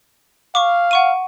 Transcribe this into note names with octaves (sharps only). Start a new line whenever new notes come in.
F5 C#6 D6
F#5 C#6 D#7